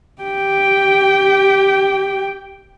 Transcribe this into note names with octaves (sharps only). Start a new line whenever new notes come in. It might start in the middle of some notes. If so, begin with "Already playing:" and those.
G4 G5